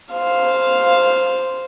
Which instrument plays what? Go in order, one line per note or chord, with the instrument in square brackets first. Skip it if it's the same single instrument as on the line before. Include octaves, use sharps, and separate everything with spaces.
[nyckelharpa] C5 F5